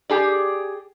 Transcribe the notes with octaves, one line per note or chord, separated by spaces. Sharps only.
G4 G#4 D5